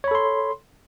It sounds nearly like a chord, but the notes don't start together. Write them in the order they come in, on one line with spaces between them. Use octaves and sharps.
C#5 B5 A4 C6